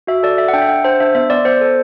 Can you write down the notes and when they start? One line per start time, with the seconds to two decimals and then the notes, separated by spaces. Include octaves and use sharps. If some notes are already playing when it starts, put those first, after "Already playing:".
0.07 F#4 E5
0.23 A4 D5
0.38 A4 E5
0.48 F#5
0.53 D4 G5
0.62 E5
0.68 D4 F#5
0.84 D4 C5
1.00 D4 E5
1.15 B3 E5
1.30 B3 D5
1.45 B3 C5
1.61 A4